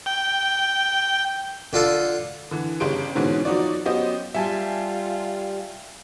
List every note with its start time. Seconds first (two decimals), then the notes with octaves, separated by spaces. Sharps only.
0.06 G5
1.73 D3 F4 A4
2.51 D3 E3
2.80 G1 C#3 G4 C6 D7
3.15 G#2 B2 D3 E3 C4 C#4
3.45 F3 F#3 D#4 F#4 C#5 D5
3.85 F#3 B3 C#4 G4 C5 D#5
4.34 G3 F4 G4 E5 G#5 A5